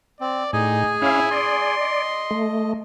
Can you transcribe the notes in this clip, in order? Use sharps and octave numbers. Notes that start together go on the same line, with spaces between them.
C4 D5
A2 D#4 G#4 G#5
C#4 E4 F5
D5 C6
D#5
A3